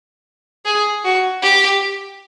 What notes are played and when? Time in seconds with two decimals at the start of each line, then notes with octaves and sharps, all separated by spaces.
0.65 G#4
1.04 F#4
1.43 G4